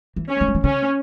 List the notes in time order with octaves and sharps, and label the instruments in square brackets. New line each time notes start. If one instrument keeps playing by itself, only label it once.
[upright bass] E3
[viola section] C#4
[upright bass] E3
F#3
E3
[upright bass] C#3 [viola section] C#4